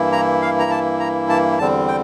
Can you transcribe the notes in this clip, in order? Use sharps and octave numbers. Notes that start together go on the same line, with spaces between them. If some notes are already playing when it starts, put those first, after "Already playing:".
Already playing: G2 E3 A#3 E4
A#5
F5
A#5
A5
A#5
A5
E2 D3 G3 C4 A5
G5